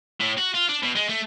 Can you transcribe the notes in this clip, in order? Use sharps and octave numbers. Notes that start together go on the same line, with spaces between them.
A2
F#4
F4
D4
B2
G#3
A3